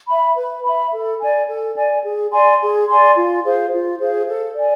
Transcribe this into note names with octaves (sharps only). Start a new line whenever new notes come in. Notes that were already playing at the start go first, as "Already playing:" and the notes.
E5 B5
B4
E5 B5
A4
D5 G#5
A4
D5 G#5
G#4
D5 G#5 C6
G#4
D5 G#5 C6
F4
G#4 C5 F5
F4
G#4 C5 F5
A4
D5 G#5